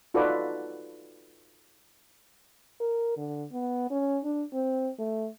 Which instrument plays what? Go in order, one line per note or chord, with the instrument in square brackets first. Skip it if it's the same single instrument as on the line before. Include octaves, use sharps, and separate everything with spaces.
[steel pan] D#4 F4 F#4 A4 B4 D5
[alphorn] A#4
D3
B3
C#4
D4
C4
A3